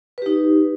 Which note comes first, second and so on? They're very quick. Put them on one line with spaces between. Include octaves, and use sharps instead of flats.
B4 G4 D#4